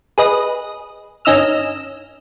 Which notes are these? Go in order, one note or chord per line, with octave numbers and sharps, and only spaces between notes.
G#4 B4 D#5
G1 C#4 D#4 D#5 E6 F6